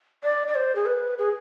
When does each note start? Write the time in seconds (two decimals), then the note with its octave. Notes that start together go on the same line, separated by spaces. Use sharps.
0.24 D5
0.48 D5
0.55 C5
0.76 G#4
0.86 B4
1.19 G#4